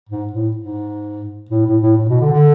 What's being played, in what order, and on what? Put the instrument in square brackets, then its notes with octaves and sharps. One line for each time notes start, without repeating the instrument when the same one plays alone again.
[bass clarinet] G#2
A2
G#2
A2
A2
A2
A2
B2
D3
D3